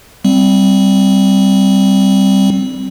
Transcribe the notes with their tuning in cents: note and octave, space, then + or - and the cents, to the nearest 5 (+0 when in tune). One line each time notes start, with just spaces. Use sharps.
G3 -10 C4 +0